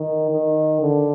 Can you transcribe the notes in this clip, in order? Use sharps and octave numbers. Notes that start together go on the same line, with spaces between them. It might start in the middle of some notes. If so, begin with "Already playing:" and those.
Already playing: D#3
D#3
D3